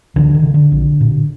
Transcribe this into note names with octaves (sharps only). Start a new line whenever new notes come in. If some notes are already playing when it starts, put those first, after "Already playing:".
C#2 D3 E3
D#3
C#3
D3
A#1
A#2